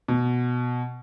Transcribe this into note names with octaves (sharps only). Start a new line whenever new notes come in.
B2